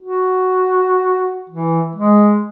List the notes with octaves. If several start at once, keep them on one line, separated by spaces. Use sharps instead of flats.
F#4
E3
G#3